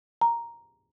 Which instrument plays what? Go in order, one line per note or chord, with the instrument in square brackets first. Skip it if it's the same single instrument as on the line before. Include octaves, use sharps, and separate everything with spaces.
[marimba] A#5